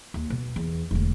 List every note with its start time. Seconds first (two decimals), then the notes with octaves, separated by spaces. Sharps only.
0.14 D#2
0.30 B2
0.56 E2
0.91 E1 D2